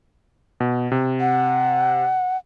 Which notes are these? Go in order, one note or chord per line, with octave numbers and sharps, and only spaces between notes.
B2
C3
F#5